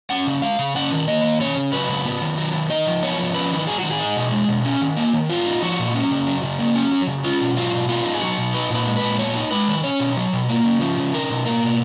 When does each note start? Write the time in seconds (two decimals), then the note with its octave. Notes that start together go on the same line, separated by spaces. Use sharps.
0.10 C#4 F#5
0.27 C#3
0.42 G#3 F5
0.59 C#3
0.75 C#4 F#5
0.92 D#3
1.07 A#3 D#5
1.23 D#3
1.40 C#4 C#5
1.57 C#3
1.72 F#3 B4
1.89 C#3
2.05 B3
2.22 D#3
2.38 F#3
2.54 D#3
2.69 D#4 D#5
2.87 F3
3.03 B3 C#5
3.18 F3
3.34 C#4 B4
3.50 D#3
3.67 F#3 G#4
3.80 D#3 F#4
3.91 G#4
3.99 D#4
4.16 B2
4.32 G#3
4.48 B2
4.65 C#4
4.81 D#3
4.96 A#3
5.13 D#3
5.29 B3 F4
5.46 D#4
5.62 F3 F#4
5.79 A#2
5.94 C#4
6.11 C#3
6.27 F#3
6.43 C#3
6.59 A#3
6.76 C#4
6.91 F#3
7.07 C#3
7.24 C#4 F4
7.41 B2
7.56 F#3 F4
7.73 B2
7.88 B3 F4
8.05 D#4
8.14 G#4
8.21 F#3 F#4
8.38 B2
8.53 D#4 B4
8.70 A#2
8.75 B4
8.86 G#3
8.97 B4
9.03 A#2
9.19 B3 C#5
9.35 D#4
9.51 G#3 B4
9.68 D#3
9.84 C#4 C#5
10.00 B2
10.17 F#3
10.33 B2
10.49 A#3
10.64 C#3
10.80 F3
10.98 C#3
11.14 D#4 A#4
11.30 B2
11.45 A#3 A#4
11.63 B2